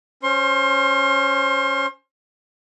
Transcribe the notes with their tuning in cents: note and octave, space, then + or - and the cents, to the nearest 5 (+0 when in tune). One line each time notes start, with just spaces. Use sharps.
C#4 +0 C5 +10 C6 +35